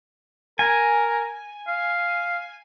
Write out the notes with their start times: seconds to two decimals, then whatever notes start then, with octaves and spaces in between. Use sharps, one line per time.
0.59 A#4 G#5
1.67 F5